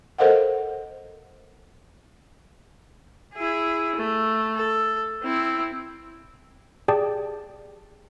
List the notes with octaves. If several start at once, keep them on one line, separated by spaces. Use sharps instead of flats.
A4 A#4 C5 D#5 F5 F#5
E4 G#4
A3
A4
C4 E4
G4 G#4 D5 G5 A5